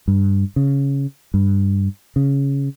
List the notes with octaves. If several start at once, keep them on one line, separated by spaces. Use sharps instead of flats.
G2
C#3
G2
C#3